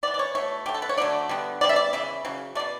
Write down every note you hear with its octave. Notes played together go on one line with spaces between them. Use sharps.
E3 B3 D5
D5
C#5
B2 A3 C#5
D3 A3 G4
A4
B4
C#5
D3 F#3 A3 D5
D3 G3 B3
C#3 G3 B3 D5
E5
D5
C#3 E3 E5
C#3 F#3
A3 D5
B2